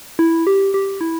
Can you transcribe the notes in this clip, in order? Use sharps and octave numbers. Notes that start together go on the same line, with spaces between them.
E4
G4
G4
E4